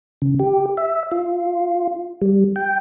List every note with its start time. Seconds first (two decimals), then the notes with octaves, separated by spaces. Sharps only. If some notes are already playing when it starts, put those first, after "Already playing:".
0.22 C#3
0.39 G4
0.77 E5
1.12 F4
2.22 G3
2.56 G5